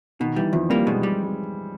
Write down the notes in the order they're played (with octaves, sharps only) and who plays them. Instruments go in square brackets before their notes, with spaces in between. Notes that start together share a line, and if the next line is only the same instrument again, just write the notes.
[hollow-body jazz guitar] B2 [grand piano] D#3
[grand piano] E3 [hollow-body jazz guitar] G3
[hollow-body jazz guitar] E2 [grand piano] F3
[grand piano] G3 [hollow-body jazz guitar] A#3
[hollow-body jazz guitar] B2 [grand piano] G#3
[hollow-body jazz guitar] G3